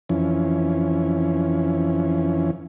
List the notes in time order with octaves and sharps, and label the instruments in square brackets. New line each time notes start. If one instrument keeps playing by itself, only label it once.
[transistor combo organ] F2 E3 C#4